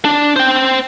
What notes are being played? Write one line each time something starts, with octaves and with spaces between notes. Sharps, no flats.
D4
C5 G5